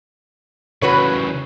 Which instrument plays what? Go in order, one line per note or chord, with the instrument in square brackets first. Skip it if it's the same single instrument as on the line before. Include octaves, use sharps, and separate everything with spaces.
[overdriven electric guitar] C#3 E3 [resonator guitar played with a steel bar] F#4 B4 C#5